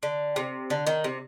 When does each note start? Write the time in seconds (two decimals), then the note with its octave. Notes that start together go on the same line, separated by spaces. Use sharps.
0.03 D3
0.36 C3
0.70 D3
0.87 D#3
1.04 C3